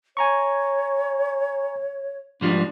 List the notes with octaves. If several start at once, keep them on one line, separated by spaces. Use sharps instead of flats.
C#5 G#5 A#5 C#6
G#2 F3 G3 D4